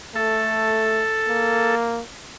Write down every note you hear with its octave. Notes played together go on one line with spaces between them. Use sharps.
A3 A4
A#3